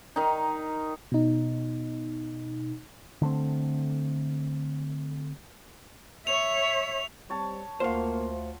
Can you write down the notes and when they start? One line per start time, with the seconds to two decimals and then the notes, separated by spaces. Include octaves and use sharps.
0.16 D#3 D#4
1.12 B2 D#4
3.22 D3 A3 C4
6.27 C#5 E5 F7
7.30 G3 C4 C#5 A5
7.80 D2 A#3 F4 C5 F5 F#5